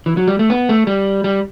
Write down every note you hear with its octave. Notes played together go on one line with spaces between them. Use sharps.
E3
F#3
G3
A3
B3
A3
G3
G3